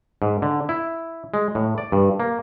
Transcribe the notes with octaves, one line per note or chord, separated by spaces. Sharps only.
G#2
D3
E4
G#3
A2
D5
G2
A#3